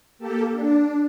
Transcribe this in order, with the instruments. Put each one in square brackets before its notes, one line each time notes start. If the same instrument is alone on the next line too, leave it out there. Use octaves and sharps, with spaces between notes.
[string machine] A#3 G4 A4
D4